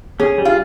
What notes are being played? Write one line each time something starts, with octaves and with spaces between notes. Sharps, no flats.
C#4 G#4
G3
F4